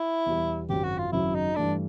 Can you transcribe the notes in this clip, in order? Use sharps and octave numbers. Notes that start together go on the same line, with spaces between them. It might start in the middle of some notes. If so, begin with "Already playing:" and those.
Already playing: E4
E2 B2 G3
G#1 F#2 C#3 F#3 G4
F#4
F4
G#1 F#2 C#3 F#3 E4
D#4
G2 E3 A3 D4